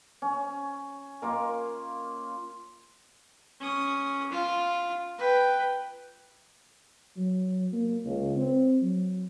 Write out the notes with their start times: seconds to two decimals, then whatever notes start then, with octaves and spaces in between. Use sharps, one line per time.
0.22 C#4
1.22 A#3 F4 A#4
3.60 C#4 D#6
4.31 F4
5.18 B4 G5
7.17 F#3
7.73 A#3
8.05 C#2
8.36 C4
8.81 F#3